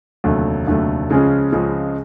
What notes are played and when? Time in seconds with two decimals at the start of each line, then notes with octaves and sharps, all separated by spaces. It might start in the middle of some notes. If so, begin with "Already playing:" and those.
0.24 F1 D#2 D3 F#3 A3
0.67 F1 D#2 D3 F#3 A3
1.09 C#2 C#3 F3 G#3 C#4
1.52 C#2 C#3 F3 G#3 C#4